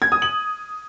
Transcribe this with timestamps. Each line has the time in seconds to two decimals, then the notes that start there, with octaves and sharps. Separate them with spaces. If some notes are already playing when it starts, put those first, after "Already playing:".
0.02 G#6
0.12 D#6
0.22 F#7